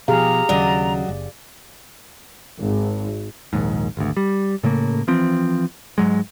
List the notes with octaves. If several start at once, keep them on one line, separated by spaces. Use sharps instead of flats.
B2 F3 G4 G#4 F5 A#5
D#2 C#3 F#3 D5 D#5
F#1
G#1
A#1 D#2 G#2
G#1 D2
G3
A2 C#3 A3 A#3
E3 F3 C4
G#2 F#3 G#3